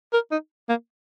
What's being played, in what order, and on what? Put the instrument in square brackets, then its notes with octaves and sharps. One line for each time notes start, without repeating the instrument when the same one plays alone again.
[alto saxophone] A#4
D#4
A#3